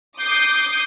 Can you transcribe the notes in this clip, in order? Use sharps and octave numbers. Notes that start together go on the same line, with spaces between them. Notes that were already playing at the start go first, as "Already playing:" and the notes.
D6 D#6 G6 C7